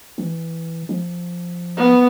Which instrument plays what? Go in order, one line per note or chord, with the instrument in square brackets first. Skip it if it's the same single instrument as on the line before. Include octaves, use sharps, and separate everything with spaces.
[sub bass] E3
F3
[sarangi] B3